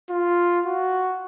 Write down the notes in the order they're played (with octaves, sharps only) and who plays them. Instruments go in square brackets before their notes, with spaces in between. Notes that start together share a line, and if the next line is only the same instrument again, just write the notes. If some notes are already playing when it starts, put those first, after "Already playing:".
[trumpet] F4
F#4